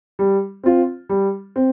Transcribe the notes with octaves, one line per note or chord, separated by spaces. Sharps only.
G3
C4 F4
G3
C4